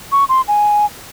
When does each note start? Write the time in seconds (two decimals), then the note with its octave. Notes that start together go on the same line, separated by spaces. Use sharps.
0.12 C#6
0.29 C6
0.48 G#5